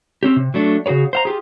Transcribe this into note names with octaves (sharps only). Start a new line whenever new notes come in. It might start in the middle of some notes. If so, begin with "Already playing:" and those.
C4 C#4 G4
C3
F#3 A3 D4
C#3 F#4 G#4 B4 C#5
C5 F5 A#5
F4 G4 G#4